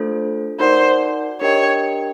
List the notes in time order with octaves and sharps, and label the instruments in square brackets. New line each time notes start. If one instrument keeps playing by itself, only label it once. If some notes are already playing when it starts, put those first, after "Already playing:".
Already playing: [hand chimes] A3 D4 F4 A4 C5
[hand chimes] D#4 F#4 A#4 D5 F#5 [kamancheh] C5
[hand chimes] D4 G4 A#4 D#5 G5 [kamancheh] C#5